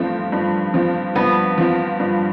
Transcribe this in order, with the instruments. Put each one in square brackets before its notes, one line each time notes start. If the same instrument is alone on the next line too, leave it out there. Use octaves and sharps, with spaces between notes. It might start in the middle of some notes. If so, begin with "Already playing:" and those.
Already playing: [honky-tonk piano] G2 F3 C4 [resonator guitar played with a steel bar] A3
[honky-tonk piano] G2
F3 C4
[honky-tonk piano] G2 [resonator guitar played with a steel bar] B3
[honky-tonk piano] F3 C4
G2